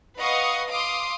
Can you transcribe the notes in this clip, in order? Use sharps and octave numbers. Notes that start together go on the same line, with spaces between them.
B4 D#5 F5 F#5 C#6 D#6
F5 C6 D6 D#6